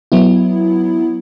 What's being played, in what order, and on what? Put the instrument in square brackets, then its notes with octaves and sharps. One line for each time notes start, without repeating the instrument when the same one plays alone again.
[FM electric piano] F#3 B3 E4